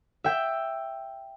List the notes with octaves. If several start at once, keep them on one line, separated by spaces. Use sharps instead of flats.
E5 G5